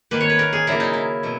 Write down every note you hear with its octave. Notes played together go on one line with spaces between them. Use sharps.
D#3 A#3 B4
C#5
B4
A#4
G#4
C#3 F#3 A#3 E4
D#4
E4
B2 F#3